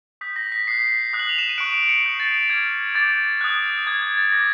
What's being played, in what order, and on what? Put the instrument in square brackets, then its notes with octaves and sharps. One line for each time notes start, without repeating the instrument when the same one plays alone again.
[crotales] D#6 G6 B6
A#6
B6
D#6 F#6 C7
D#6 F#6
F#7
F7
E7
D#7
C#6 F#6 D7
D7
C#7
D#6 G6 C7
A6
D6 F6 G#6
D6 G6 A6
D#6 F#6
D#6 G6 G#6
G#6
A6
D6 F#6 A#6